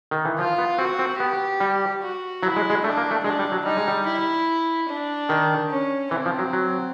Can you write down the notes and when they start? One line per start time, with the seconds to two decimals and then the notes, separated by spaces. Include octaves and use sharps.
0.11 D#3
0.25 E3
0.39 F3 F4
0.58 B3
0.78 C4 F#4
0.99 C4
1.20 B3 G4
1.60 G3
2.03 F#4
2.42 F#3 E4
2.56 G#3
2.70 G#3
2.84 A3 D4
2.97 A#3
3.11 A3
3.24 G#3 D4
3.39 G3
3.52 F#3
3.65 G3 D#4
3.77 G#3
3.88 G3
4.06 E4
4.89 D4
5.29 D#3
5.70 C#4
6.11 E3 C4
6.26 F3
6.39 F#3
6.53 F#3